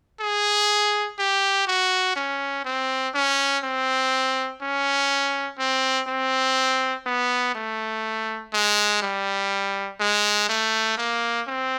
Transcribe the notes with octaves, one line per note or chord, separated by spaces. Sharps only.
G#4
G4
F#4
C#4
C4
C#4
C4
C#4
C4
C4
B3
A3
G#3
G3
G#3
A3
A#3
C4